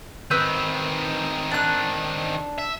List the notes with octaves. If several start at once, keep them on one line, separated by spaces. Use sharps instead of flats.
D#3 C4 B4 E6 G6
D4 F#6
E5